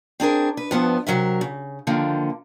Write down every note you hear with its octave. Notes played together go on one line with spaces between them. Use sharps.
C4 D4 G#4 A#4
B4
G2 F3 B3
C3 F#3 A#4 E5
C#3
D3 D#3 F3 A#3